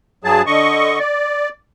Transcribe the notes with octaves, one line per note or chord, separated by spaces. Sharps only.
G2 F#3 G#4 A5
D3 D#5 C#6
D5